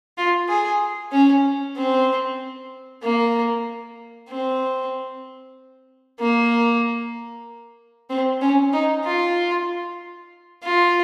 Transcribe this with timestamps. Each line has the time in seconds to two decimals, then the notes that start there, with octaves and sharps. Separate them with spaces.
0.18 F4
0.48 G#4
1.12 C#4
1.76 C4
3.03 A#3
4.29 C4
6.19 A#3
8.10 C4
8.41 C#4
8.73 D#4
9.05 F4
10.63 F4